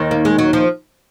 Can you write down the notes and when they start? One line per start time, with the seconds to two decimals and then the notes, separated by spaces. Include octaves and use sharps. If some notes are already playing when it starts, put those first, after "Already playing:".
Already playing: D#2 D#3
0.11 A#3
0.25 G#3
0.39 F#3
0.53 F3